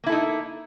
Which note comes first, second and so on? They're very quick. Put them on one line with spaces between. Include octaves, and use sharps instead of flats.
A#3 E4 A4 D#4